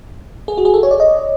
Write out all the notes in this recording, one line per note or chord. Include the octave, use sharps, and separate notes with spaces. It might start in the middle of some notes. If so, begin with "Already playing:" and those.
G#4
F#4
G#4
A4
C#5
D5
D#5